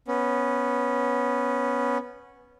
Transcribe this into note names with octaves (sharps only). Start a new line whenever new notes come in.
B3 C#4